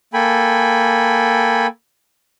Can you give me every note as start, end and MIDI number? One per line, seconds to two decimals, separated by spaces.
0.14 1.67 58
0.14 1.67 69
0.14 1.67 79
0.14 1.67 80
0.14 1.67 83